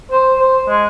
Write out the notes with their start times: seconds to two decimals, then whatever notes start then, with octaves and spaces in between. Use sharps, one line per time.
0.12 C5
0.39 C5
0.67 G#3